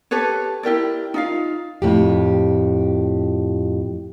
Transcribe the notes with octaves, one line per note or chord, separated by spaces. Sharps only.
G4 A4 B4 C#5
E4 G4 A#4 D5
D#4 F4 F5
F2 A2 G4